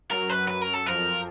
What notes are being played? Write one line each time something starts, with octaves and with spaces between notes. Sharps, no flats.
F#2 F#3 A#4
B4
B4
A#4
A4
F2 F3 A#4